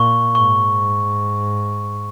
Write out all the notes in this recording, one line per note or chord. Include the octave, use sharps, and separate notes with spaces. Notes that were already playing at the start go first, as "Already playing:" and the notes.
Already playing: A#2 C#6
G#2 C#6